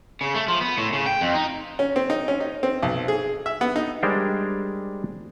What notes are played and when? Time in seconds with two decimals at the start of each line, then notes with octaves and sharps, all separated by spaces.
0.21 C#3
0.34 A3
0.48 F3
0.61 B3
0.78 A2
0.93 C#3
1.06 G5
1.21 F2
1.34 D#4
1.79 C#4
1.96 C4
2.10 D#4
2.28 C#4
2.40 D#4
2.63 C4
2.82 B1
3.08 G#4
3.46 E5
3.61 B3
3.76 D#4
4.03 G3 G#3 D4 A#4 C5 G5